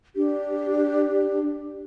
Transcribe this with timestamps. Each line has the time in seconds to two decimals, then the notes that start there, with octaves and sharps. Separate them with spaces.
0.16 D4 G4